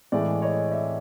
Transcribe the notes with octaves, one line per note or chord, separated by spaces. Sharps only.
A2 E3 G#3 D5
C#5 D#5
D5 E5